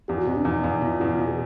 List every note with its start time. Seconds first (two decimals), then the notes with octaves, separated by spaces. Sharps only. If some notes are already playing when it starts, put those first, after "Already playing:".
0.08 E2 G4
0.18 F#4
0.27 B2 C4
0.36 D4
0.45 E2 D#4
0.64 E2
0.74 D#4
0.81 B2 E4
0.92 F4
1.00 E2 E4
1.09 F4
1.19 B2
1.28 G#4